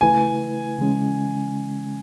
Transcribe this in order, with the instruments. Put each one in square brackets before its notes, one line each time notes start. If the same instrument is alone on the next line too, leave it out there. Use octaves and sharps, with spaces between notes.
[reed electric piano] C#3 E3 A3 E4 B4 [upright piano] G#5
[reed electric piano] C#3 E3 G#3 C#4